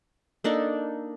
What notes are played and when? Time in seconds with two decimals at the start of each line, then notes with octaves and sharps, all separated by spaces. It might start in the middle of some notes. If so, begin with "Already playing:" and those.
0.44 A#3 D4 D#4 A4